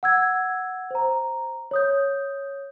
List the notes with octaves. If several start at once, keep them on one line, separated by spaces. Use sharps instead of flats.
F#5 E6 G#6
C5 A#5
C#5 D#6 G6